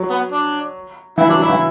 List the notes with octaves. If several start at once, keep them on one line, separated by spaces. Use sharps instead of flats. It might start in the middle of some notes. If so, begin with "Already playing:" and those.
Already playing: F#3
B3
D4
E3 E4
F#3 D4
F#3 E4
E3